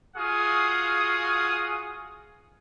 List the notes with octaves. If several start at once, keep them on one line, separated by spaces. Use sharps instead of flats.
F4 F#4 G#4 F5 D#6